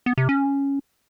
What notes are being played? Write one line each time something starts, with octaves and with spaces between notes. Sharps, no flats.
B3
C3
C#4